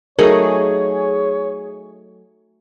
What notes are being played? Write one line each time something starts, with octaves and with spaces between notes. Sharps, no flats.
F#3 A3 D#4 G#4 A#4 C#5